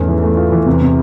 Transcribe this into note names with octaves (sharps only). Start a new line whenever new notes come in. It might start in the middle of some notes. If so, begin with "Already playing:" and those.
Already playing: E2 G#2 A3 C#4
E3
A3
F4
E3
E2 C3
C3